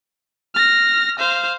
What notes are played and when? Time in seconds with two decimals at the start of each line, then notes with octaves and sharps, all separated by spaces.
0.55 F6 A#6
1.19 C5 F5